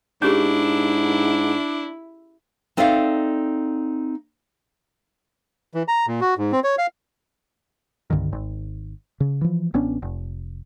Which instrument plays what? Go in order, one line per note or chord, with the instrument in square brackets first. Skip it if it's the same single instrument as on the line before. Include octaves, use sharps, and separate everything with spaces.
[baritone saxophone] G#2 [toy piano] C#4 G4 G#4 [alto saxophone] D4 [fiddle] E4
[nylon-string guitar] C4 D#4 A4 D5 E5 F5
[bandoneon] E3
A#5
A#2
F#4
G#2
C4
C#5
F5
[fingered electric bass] C2 G2 D3 D#3
G#1
C#3
E3 F3
A1 B3 C#4 D4
F1